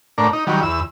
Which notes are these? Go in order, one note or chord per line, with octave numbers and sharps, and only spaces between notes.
A2 D4 A#4
D#4
D#3 F#3 G3
E2 E6